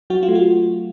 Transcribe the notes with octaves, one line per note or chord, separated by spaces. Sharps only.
F#3 F#4
F4
A3
F#4